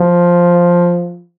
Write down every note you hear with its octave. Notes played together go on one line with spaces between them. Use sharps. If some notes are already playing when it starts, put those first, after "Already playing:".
Already playing: F3